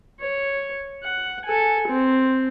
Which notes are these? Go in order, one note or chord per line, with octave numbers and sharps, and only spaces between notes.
C#5
F#5
A4 G#5
C4